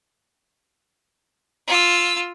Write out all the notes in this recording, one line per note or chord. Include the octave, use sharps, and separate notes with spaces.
F4 E6